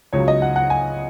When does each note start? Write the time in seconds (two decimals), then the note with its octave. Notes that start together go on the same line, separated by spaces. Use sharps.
0.13 C#2 C#3 F#3 C#5
0.28 D#5
0.42 F#5
0.56 F#5
0.70 G#5